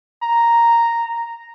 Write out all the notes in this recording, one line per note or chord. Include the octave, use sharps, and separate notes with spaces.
A#5